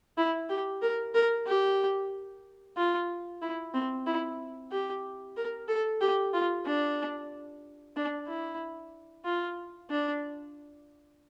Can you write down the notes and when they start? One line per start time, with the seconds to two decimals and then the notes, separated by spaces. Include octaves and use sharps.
0.17 E4
0.49 G4
0.82 A#4
1.14 A#4
1.47 G4
2.77 F4
3.42 E4
3.74 C4
4.06 E4
4.72 G4
5.37 A#4
5.68 A4
6.01 G4
6.34 F4
6.65 D4
7.96 D4
8.28 E4
9.25 F4
9.90 D4